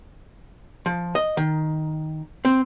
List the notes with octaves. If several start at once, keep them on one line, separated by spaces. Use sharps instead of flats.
F3
D#5
D#3
C4